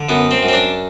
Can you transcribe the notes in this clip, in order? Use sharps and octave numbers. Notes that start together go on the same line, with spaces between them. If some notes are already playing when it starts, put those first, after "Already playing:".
Already playing: D3
F#2 B3
C4
F#2
C4
D4